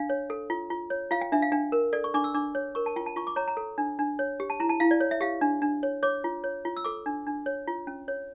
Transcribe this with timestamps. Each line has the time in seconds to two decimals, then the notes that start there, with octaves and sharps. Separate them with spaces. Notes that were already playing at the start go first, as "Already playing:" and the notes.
Already playing: D4 F5
0.10 C#5
0.30 A4
0.50 F4
0.70 F4
0.90 C#5
1.11 F4 F5
1.21 G5
1.32 D4 E5
1.42 F5
1.52 D4 G5
1.72 A#4
1.93 A4 D5
2.04 C#6
2.14 D4 D6
2.24 E6
2.34 D4 D6
2.55 C#5
2.75 A#4 C#6
2.86 A5
2.96 F4 G5
3.06 A5
3.16 F4 C#6
3.27 D6
3.36 C#5 A#5
3.48 A#5
3.57 A4
3.78 D4
3.99 D4
4.19 C#5
4.40 G4
4.50 A5
4.60 E4 A#5
4.69 A5
4.80 E4 F5
4.91 D5
5.00 C#5
5.11 E5
5.21 G4 F5
5.41 D4
5.62 D4
5.83 C#5
6.03 C#5 D6
6.24 F4
6.44 C#5
6.65 F4
6.77 E6
6.85 A4 D6
7.06 D4
7.27 D4
7.46 C#5
7.68 F4
7.87 C#4
8.08 C#5